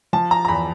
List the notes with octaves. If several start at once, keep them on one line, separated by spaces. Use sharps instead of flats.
F3 A5
A#5
A#5
E2 B5